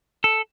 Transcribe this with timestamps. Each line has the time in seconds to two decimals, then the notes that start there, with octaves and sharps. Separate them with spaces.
0.24 A4